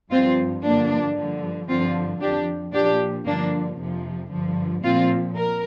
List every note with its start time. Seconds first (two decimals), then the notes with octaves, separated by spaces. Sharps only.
0.11 G2 F3 C4 F4
0.64 G2 D3 F3 A#3 D4
1.17 G2 D3 F3
1.69 G2 D3 F3 C4 F4
2.21 F2 F3 D4 G4
2.73 A#2 F3 D4 G4
3.26 G2 D3 F3 A#3 D4
3.79 F2 C3 F3
4.31 G2 D3 F3
4.84 A#2 F3 C4 F4
5.36 A#4